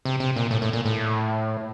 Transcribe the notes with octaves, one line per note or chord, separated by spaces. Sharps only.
C3
C3
A#2
A2
A2
A#2
A2